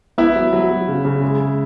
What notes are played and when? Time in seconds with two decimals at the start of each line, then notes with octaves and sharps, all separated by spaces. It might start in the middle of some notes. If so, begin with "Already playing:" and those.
0.18 B3 E4
0.36 F#3
0.53 F#3
0.70 F#3
0.87 C#3
1.05 C#3
1.22 G#3
1.39 G#3